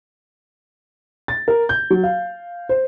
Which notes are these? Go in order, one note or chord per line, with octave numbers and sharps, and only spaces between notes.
A6
A#4
G6
F#3
F5
C5